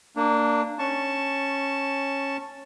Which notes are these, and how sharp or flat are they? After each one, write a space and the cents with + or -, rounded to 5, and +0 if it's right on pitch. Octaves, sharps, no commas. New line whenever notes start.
A#3 -15 D4 +0
C#4 -15 A5 +0 C#6 +0